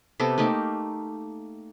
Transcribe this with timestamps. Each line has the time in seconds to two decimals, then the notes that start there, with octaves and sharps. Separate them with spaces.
0.20 C3 B3 G4 A4
0.38 A3 A#3 D#4 G4